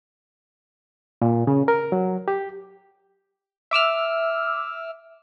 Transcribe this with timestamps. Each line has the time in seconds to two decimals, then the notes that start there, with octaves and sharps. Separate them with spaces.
1.22 A#2
1.47 C#3
1.68 A#4
1.92 F#3
2.28 G4
3.71 E5 D6 E6 F6